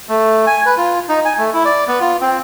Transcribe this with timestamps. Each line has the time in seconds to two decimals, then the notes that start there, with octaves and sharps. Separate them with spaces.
0.09 A3
0.47 G#5
0.66 B4
0.77 F4
1.09 D#4
1.25 G#5
1.38 A3
1.53 E4
1.65 D5
1.88 B3
2.00 F4
2.21 C4